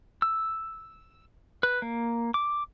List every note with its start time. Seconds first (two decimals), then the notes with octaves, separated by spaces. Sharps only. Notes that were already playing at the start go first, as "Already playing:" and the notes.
0.22 E6
1.63 B4
1.82 A#3
2.34 D6